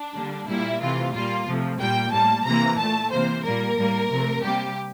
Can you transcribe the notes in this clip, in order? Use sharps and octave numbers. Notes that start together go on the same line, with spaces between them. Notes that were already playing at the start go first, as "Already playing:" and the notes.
Already playing: D4
D3 G3 A#3
A#2 G3 A#3 E4
C3 E3 A3 F4
A#2 G3 A#3 F4
C3 F3 A3
A#2 G3 A#3 G5
A2 G3 A#3 A5
C3 E3 A#3 A#5
A#2 A3 A5
C3 E3 A#3 C5
A#2 G3 A#3 A#4
A2 G3 A#3
C3 F3 A3
C3 G3 A#3 G4